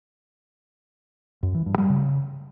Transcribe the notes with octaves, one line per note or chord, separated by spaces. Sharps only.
F#2
E3
G2
G3
C#3